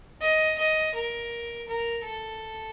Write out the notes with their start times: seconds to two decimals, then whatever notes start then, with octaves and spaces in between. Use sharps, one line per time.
0.21 D#5
0.58 D#5
0.94 A#4
1.68 A#4
2.04 A4